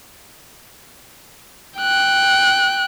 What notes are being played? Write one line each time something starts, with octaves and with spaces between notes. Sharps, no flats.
G5 F#6